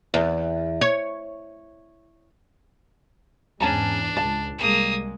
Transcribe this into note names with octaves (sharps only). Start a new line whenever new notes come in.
E2
C#5
E2 G#2 C#4 D4 A5 A#5
C#2 A5
C2 G3 G#3 A#3 D#6